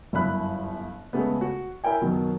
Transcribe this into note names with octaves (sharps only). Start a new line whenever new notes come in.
G1 F#2 E4 B5 F#6
C#3 G#3 A3 B3
F#4
E4 A#4 G5 G#5
F#2 B2 D#3 F#3